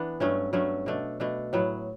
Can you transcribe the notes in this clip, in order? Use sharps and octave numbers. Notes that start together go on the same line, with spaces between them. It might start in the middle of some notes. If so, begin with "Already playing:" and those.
Already playing: E3 B3 D4
G2 F#3 A3 C#4
G2 F#3 A3 C#4
B2 A3 D4
B2 A3 D4
A2 F#3 B3